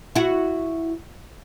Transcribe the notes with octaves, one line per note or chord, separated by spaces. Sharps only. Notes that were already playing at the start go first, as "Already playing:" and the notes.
E4 F#4